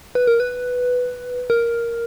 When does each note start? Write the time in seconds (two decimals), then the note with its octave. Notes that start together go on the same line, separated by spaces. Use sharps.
0.15 B4
0.27 A#4
0.40 B4
1.50 A#4